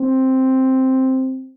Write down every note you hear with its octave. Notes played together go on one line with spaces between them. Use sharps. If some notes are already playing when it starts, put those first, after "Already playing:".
Already playing: C4